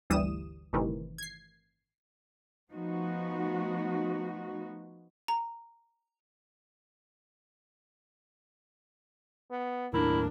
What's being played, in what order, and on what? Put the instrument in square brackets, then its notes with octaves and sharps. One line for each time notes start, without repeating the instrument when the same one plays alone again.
[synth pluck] G1 D2 E3 G3 D#6 E7
G1 A2 C3 D#3 E3
G#6 C7
[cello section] F3 A3 B3 D#4 F#4
[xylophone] A#5
[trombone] B3
[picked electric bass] D#2 A2 [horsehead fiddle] D4 [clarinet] E4 [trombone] A#4